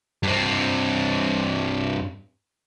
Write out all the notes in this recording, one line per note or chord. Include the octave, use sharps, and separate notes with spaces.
G2 C4